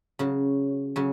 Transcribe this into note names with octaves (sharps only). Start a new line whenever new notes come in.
C#3 F#3
C#3 F#3